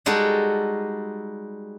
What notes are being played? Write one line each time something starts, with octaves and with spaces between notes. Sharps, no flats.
G3 G#3 D#4 F#4 A4